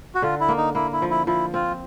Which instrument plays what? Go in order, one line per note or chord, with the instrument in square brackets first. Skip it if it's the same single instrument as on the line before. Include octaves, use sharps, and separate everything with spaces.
[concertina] F#4
[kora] D3 [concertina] F4
[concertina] E4
[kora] A#3
[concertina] D#4
[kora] A#3 [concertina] E4
[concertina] E4
[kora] F3
[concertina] E4
[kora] F3 [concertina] E4
[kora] C4 [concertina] F4